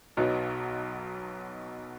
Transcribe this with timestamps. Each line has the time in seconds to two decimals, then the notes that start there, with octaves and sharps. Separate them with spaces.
0.17 B1 B2 F#3 B3 D#4